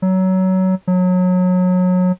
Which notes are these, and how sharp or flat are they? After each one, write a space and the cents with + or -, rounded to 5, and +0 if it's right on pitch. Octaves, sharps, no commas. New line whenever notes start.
F#3 +20
F#3 -25